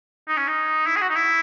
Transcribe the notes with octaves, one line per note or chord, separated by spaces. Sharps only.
D#4
C#4
D#4
E4
G#4
F#4
D#4
E4